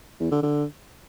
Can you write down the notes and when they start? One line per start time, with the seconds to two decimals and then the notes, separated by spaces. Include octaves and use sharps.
0.20 E2
0.31 D3
0.43 D3